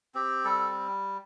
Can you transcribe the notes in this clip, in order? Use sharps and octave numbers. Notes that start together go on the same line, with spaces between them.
C4 G4
G3 A4